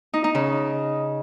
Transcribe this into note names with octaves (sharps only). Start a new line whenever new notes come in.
D#4
D#4
C#3